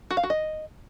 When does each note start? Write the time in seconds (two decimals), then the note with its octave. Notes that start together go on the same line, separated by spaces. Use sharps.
0.11 F#4
0.17 F5
0.23 F#4
0.30 D#5